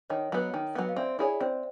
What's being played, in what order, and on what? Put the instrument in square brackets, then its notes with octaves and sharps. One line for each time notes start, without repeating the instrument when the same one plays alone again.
[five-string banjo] D#3 [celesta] C#5 D#5
[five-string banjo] F#3 B3
D#3
F#3 B3
[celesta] F5
[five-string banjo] C4 [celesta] D5 E5
[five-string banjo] E4 G#4 C#5 [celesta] D5 E5
[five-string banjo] C4 [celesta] C5 D5